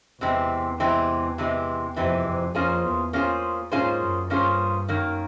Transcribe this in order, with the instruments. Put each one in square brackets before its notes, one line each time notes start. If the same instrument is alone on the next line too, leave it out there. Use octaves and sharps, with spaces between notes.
[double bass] E2 [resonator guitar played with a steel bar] C3 E3 G#3 C4
[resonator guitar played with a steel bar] C3 E3 G#3 C4
C3 E3 G#3 C4
[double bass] F2 [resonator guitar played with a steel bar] C3 E3 G#3 C4
[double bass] F2
[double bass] F2 [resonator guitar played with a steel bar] A#3 C#4 F4 G#4 C5
[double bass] E2
[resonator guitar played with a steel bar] A#3 C#4 F4 G#4 C5
[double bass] G#2 [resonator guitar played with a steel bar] A#3 C#4 F4 G#4 C5
[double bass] F#2
[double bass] G2 [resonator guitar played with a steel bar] A#3 C#4 F4 G#4 C5
[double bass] F#2 [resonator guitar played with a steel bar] D#3 F#3 A#3